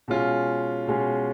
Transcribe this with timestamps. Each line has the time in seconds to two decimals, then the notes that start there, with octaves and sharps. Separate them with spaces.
0.08 B2 G#3 C#4 F4
0.87 B2 G#3 C#4 F4